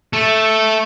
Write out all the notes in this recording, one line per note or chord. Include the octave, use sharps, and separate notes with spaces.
A3